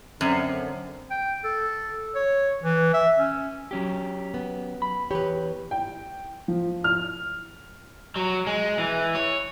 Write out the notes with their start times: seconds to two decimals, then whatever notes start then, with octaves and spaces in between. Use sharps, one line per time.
0.21 F#2 D3 C4
1.11 G5
1.44 A4
2.15 C#5
2.62 E3
2.93 E5
3.18 C#4
3.71 F#3 C#4 G4
4.34 B3
4.82 B5
5.11 E2 G4 B4 C#5
5.71 G5
6.48 F3
6.84 F6
8.16 F#3
8.46 G#3
8.78 E3
9.15 C#5